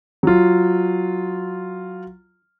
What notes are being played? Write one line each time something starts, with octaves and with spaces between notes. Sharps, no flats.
F#3 F4